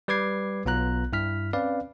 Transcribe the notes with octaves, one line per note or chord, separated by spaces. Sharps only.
G3 B4 D6 G#6 C7
B1 B3 F4 A#5 F#6
G2 E4 F6 B6
C4 C#4 B4 D5 F5